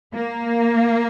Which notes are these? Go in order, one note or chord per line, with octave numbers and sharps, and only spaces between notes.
A#3